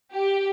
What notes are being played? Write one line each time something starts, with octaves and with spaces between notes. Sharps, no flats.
G4